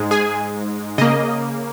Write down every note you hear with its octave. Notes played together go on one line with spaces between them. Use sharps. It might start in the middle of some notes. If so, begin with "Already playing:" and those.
Already playing: G#2 G#3
G#4 G#5
C#3 A#3 D#5